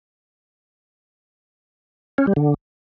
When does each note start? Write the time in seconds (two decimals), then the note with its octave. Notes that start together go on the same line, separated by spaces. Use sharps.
2.18 C#4
2.27 G3
2.36 D3